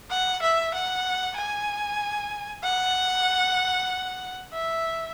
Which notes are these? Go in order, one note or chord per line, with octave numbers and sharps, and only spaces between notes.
F#5
E5
F#5
G#5
F#5
E5